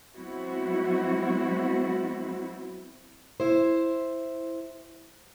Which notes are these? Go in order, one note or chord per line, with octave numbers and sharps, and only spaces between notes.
F#3 G#3 B3 C4 E4 F#4
E4 C5